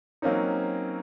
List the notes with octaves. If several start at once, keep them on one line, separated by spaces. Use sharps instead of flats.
F#3 A#3 C4 C#4 D#4